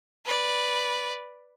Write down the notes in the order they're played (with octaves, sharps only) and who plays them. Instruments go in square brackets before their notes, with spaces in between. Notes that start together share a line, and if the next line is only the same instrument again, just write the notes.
[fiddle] B4 D5